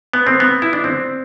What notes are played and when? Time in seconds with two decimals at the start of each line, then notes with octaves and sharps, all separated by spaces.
0.13 B3
0.27 C4
0.40 B3
0.62 E4
0.73 D4
0.84 C4